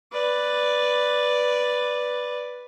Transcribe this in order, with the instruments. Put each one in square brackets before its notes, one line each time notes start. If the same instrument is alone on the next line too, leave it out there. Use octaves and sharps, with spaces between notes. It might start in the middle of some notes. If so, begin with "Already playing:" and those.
[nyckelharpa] B4 D5